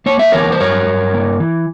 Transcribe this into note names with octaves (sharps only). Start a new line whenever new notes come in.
A#3 C#5
E5
E3 A#4 C#5
C5
G2 A#4 C#5
G2
A#3
E3